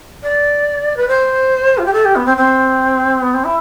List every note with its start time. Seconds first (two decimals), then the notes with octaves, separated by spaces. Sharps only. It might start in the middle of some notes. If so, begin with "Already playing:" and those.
0.23 D5
0.97 B4
1.08 C5
1.78 F4
1.86 G4
1.93 A4
2.05 G4
2.16 B3
2.26 C4
2.37 C4
3.22 B3
3.33 C4
3.44 E4